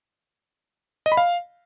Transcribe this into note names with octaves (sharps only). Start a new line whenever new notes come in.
D#5
B5
F5